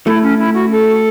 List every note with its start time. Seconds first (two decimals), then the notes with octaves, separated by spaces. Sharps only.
0.07 A3 E4
0.23 C#4
0.39 E4
0.55 F#4
0.71 A4